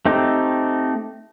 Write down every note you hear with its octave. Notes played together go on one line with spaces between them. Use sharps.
A3 C4 D#4 G4